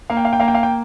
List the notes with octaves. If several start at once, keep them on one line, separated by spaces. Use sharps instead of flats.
A#3 F5
G5
F5
G5
A#3 F5
G5
F5
G5